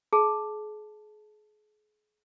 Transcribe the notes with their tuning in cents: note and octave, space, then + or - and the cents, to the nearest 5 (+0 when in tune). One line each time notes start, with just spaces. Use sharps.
G#4 +35 A5 +0